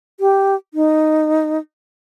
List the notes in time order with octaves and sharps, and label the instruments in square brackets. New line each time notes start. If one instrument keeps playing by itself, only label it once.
[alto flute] G4
D#4